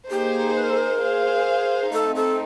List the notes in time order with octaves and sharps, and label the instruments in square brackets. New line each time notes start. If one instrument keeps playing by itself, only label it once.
[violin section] A#3 D#4 G#4 C5 [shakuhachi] G4
[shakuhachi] B4
A#4
A4
A#4
[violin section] G#4 C5 F5
[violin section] A3 C4 D#4 [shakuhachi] A4
[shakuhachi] A4